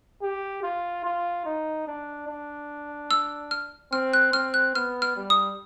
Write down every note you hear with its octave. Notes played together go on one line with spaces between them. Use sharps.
G4
F4
F4
D#4
D4
D4
E6
F6
C4 F6
F#6
C4 F6
F#6
B3 F6
F6
G3
D#6